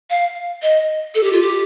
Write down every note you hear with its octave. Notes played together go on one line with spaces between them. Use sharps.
F5
D#5
A4
G4
F4
G4